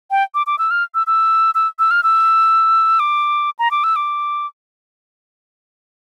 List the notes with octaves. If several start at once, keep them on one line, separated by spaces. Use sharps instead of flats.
G5
D6
D6
E6
F6
E6
E6
E6
E6
F6
E6
D6
A#5
D6
E6
D6